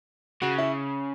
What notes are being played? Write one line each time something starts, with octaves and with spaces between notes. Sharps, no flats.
C#3 F#4
E4